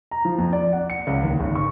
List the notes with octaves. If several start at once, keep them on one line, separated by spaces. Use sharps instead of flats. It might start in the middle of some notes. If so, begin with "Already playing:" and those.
A#5
F3
F2
D5
F#5
C#7
C#2
D#2
G#1
C#6